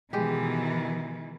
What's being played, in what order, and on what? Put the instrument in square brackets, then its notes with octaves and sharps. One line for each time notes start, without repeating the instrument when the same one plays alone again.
[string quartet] B2 [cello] D#3 E3 [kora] G#3 G4